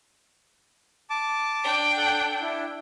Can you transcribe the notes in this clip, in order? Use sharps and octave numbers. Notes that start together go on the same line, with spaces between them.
A5 D6
D4 G5
A4 F#5
D4 E4